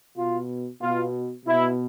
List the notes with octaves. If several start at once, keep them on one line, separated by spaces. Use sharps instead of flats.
B2 F4
B2 F4
B2 E4